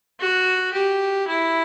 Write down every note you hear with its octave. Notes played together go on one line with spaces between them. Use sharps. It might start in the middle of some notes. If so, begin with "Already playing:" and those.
F#4
G4
E4